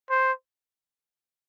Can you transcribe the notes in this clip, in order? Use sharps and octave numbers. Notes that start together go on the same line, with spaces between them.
C5